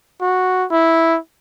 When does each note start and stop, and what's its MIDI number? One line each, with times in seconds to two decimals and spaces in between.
0.21 0.65 66
0.71 1.18 64